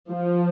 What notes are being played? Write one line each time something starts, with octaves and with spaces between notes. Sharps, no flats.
F3